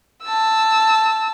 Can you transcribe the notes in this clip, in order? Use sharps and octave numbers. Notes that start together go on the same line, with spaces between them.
A5 E6